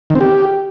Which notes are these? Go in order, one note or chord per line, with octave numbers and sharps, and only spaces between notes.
D#3
C4
G4